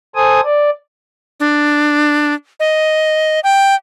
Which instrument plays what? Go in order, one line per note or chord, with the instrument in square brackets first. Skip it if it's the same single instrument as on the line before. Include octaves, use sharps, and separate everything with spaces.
[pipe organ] A4 C5 G#5 D#6
D5
[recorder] D4
D#5
G5